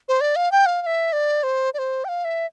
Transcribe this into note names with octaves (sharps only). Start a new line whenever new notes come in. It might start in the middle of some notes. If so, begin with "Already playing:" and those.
C5
D5
F5
G5
F5
F5
E5
D5
C5
D5
C5
G5
F5
E5